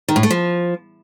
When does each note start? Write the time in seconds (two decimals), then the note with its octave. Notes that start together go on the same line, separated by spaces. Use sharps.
0.08 D#3
0.16 A2
0.23 A3
0.31 F3